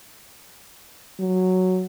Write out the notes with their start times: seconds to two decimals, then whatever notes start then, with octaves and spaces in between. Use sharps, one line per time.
1.19 F#3